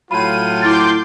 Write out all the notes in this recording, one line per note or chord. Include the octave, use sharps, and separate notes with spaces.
A2 F#3 F4 B5 D#7
E4 C6 D6 F6 G6 A6